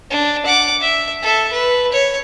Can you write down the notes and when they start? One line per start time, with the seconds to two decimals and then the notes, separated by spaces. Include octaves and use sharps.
0.11 D4
0.46 F#5 D6
0.80 E5
1.23 A4 E5
1.52 B4
1.92 C#5